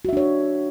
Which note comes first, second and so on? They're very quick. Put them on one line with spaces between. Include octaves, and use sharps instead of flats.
F#4 E5 D4 C#5